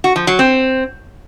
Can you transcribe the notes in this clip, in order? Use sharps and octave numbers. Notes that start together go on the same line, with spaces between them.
F#4
F3
F#3
C4